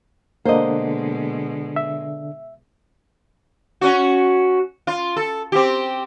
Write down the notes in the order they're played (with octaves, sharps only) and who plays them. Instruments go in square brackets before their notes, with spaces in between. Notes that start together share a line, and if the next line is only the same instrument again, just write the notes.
[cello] B2 G#3 [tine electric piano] D3 D4 [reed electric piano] A#3 [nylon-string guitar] C5 D#5
[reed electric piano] E5
[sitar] C#4 F#4
F4
A4
C4 G4